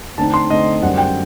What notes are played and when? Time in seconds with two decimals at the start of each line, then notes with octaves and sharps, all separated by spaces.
0.18 D3 A3 C4 D#4 A5
0.34 C6
0.50 D3 A3 C4 D#4 D#5
0.82 F#2 D3 G3 C4 F#5
0.98 G5